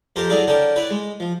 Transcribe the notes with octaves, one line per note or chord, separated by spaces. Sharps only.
F2 G4 A#4 C5 A5
F#3 E4 G#4 A4 D5 F5
D3 C#4 A#4 G5 A5
E4 B4 C#5 D5
G#3
F3